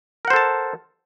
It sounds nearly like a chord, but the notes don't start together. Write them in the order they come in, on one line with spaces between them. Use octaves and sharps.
A#4 F#5 C5 A4 A5